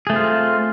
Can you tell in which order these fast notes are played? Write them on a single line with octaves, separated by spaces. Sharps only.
G#4 A3 C4 F4